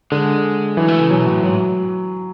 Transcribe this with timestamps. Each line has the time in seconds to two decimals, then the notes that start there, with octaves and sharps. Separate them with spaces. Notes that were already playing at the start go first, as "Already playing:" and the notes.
0.12 D3 G#3
0.77 E3 F#3
0.88 A3
1.00 C#3
1.10 B2 F#3
1.26 A2
1.43 G#2 F#3